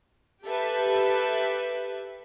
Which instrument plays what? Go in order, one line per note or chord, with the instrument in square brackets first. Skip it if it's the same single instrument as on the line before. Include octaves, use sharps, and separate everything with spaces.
[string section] G4 A4 B4 E5